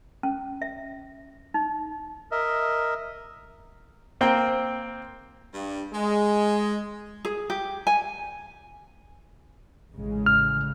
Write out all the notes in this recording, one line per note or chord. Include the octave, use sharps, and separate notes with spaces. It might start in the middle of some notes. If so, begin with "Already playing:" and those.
C#4
E5
D#4
A#4 D#5 E5
A#3 C4 G5
G2
G#3
G#4
G4
G#5
A1 C#3 G#3
F6